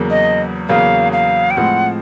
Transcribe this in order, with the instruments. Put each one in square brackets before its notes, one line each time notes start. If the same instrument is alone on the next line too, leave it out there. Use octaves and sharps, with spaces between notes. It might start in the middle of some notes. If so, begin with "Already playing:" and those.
Already playing: [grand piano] E2 C#3 F#3 A#3
[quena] D#5
[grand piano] E2 C#3 F#3 A#3 [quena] F5
[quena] F5
G5
[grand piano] A2 F3 G#3 C4 [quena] F#5